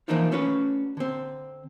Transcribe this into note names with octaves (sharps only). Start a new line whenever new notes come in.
E3 F3 A#3 D4 D#4 F4
A3 C#4 D4 F#4 B4
D3 C4